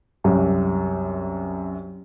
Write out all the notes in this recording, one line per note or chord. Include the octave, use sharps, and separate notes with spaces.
C2 F#2